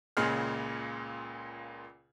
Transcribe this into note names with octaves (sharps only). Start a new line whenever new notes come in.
C#2 A#2 C#3 G#4 F6